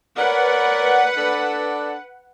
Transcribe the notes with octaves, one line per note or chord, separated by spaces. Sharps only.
A#4 B4 C#5 D5 F#5
D4 A4 D5